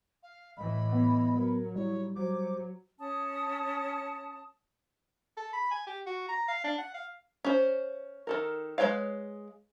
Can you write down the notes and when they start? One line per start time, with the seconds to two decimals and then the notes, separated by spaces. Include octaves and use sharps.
0.23 F5
0.57 A2 E3 D#5 B5
0.92 B3
1.36 F#3 A#4
1.76 G3 E4 C#5
2.16 F#3 C5 D6
2.99 C#4 A5 D#6
5.37 A4
5.53 B5
5.71 G#5
5.87 G4
6.07 F#4
6.29 A#5
6.48 F5
6.64 D4
6.78 F#5
6.94 F5
7.45 C#4 C5
8.27 D#3 A4 A#4
8.78 G#3 A#4 B4 C#5 F5